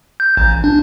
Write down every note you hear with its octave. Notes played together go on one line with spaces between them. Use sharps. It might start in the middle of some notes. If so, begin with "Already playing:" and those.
G6
A1
D4